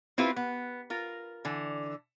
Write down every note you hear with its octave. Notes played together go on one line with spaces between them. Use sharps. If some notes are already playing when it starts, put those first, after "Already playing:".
C4 E4 F4 G4 B4
B3
F4 A#4
D3 E3